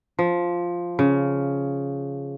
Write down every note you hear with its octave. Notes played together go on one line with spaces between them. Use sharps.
F3
C#3